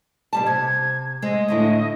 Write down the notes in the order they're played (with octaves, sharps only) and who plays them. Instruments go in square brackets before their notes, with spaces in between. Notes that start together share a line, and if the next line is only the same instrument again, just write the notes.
[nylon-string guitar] B2 G3 A5
[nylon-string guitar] C3 [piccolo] G#6
[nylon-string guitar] G#3 C4 [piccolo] D#5
[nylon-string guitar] A2 D3 E4